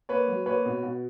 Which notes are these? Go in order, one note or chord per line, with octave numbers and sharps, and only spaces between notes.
A#3 B4 C#5
F#3
A#3 B4 C#5
B2
B2